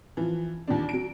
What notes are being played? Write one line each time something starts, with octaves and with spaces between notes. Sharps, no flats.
E3 F3
D#2 A#2 D4
F#3 D7